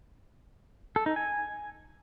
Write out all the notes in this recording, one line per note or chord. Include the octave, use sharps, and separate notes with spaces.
A4
D#4
G#5